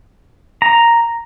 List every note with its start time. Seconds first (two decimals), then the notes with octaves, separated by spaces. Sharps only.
0.62 A#5